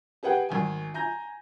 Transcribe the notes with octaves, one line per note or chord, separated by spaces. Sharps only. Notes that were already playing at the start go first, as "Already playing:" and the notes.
G4 G#4 B4 F#5 G5
G#1 D#3 G#5
G#5 A#5 G6 A#6